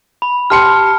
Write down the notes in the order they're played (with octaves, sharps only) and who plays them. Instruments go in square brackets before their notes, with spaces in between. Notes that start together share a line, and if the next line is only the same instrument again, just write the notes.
[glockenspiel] B5
[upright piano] G4 C6 C#7 [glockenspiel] A5 F6